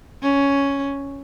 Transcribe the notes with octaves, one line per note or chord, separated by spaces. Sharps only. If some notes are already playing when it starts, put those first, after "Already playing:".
C#4